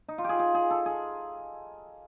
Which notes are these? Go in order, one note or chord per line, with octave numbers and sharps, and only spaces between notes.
D#4
F4
G4 G#4
G#4
G#4
A4
G#4